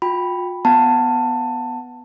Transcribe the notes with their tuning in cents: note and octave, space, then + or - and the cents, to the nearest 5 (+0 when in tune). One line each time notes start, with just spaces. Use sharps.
F4 +40 G5 +0 B5 +0
B3 +0 F#5 +0 A5 +15